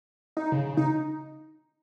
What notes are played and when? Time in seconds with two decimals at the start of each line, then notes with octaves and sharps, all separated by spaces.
0.37 D#4
0.52 C#3
0.67 C#3
0.77 D#4